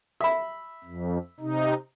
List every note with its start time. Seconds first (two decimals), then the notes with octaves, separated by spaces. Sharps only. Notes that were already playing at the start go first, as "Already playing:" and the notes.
0.21 E5 B5
0.84 F2
1.40 C3 D#4